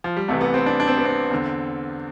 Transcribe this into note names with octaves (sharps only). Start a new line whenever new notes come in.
F3
G3
C2 C3 E3 A3
B3
C4
D4
D4
C4
B3
C4
E2 D3